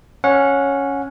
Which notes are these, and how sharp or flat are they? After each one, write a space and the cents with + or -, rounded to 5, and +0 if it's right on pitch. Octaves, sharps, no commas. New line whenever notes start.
C#4 +0 C#5 +0 F#5 -25